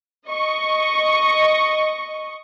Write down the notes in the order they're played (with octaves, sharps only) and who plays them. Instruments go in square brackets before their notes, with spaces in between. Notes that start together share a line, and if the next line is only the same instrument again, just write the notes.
[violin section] D#5 C#6